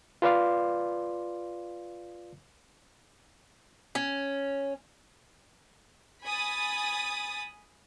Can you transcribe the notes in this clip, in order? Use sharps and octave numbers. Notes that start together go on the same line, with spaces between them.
F4 B4 D5 F5 C6
C#4
G#5 B5 D#6 A6